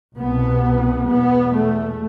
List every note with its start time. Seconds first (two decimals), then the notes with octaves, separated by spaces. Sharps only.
0.18 C2 B2 B3
1.08 E2 B2 B3
1.54 A3